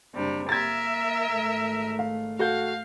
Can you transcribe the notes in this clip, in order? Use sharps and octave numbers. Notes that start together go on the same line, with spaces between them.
F#1 C3 G3 D4
A#3 A#4 E5 G#6 A6
G#1 A3
F5
F#4 A4 F5 G6